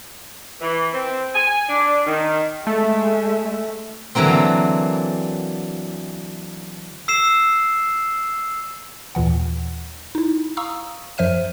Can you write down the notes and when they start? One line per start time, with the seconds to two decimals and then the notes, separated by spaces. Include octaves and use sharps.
0.61 E3
0.93 C4
1.34 G#5
1.69 D4
2.06 D#3
2.67 G#3 A3 E5
4.15 D3 E3 F#3 A#3 C4
7.08 E6 C7 E7
9.15 D#2 A#2 E3 F#5
10.15 D#4 E4
10.57 F5 A#5 C#6 D#6 E6
11.18 F#2 F3 C5 E5 F6 D#7